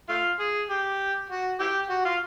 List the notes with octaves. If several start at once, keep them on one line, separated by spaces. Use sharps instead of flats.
A3 F4
G#4
G4
F#4
E4 G4
F#4
F4